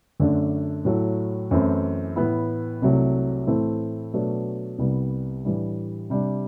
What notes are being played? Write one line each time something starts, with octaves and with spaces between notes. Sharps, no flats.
F#2 D3 A3 D4
A2 F#3 A3
F#2 E3 A3 C4 E4
A2 E3 B3 E4
C2 C3 F#3 A3
A2 E3 A3 C4 E4
B2 F#3 A3 D4
C2 C3 G3 B3
A2 E3 G3 D4
C3 G3 D4